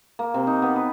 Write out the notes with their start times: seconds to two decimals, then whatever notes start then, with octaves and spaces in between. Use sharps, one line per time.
0.19 A#3
0.34 C3
0.47 D#4
0.62 B3
0.76 B4